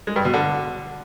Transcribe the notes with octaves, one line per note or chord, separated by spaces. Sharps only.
G#3
G2
B2
D3